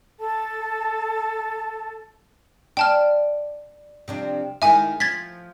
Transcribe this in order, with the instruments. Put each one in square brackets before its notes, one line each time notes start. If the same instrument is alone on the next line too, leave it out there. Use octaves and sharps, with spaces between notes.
[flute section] A4 A5
[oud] D5 [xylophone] G5 A5 F6
[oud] C3 F3 D4
[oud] D#3 G#3 E4 [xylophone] E5 G#5
[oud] F3 [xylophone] G#6 A6 B6